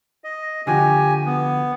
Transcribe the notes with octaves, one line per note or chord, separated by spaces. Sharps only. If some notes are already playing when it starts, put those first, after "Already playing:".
D#5
D3 F3 F#4 G4 G#5
B3